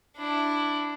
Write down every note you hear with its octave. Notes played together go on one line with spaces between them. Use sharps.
D4 E4